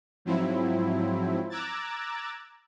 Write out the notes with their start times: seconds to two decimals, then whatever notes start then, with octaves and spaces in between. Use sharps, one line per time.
0.25 G#2 F3 F#3 C4 E4
1.50 A#5 D6 E6 F#6 G#6 A6